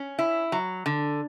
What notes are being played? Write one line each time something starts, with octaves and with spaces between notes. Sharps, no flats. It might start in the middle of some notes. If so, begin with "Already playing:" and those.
Already playing: C#4
E4
F#3
D3